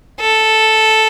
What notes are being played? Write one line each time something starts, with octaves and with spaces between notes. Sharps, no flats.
A4